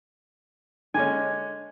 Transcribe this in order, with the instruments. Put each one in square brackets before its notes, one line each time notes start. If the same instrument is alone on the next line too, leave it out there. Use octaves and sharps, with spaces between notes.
[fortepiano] D3 G#3 C#4 [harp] G#5